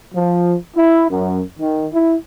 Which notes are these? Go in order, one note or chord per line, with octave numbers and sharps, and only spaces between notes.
F3
E4
F#2
D#3
E4